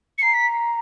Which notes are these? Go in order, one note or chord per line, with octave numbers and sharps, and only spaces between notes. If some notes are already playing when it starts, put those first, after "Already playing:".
C#7
A#5 C7
B6